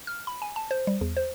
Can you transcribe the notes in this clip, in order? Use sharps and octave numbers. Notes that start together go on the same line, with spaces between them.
F6
B5
G#5
A5
C5
G3
E2
C5